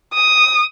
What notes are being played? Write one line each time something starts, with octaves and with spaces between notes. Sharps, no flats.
D#6